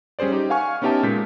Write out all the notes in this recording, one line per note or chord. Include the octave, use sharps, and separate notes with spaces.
G3 C#4 G#4 C5 D5
D#4 G4
F5 F#5 G#5 C#6 F6
B3 C#4 D#4 G4 E5 A5
A#2 G#3 G6 B6